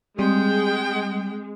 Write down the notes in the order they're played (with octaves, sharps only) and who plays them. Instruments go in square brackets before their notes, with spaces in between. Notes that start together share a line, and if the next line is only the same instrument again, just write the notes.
[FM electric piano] G3 [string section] G#3 [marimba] C4 [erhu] G5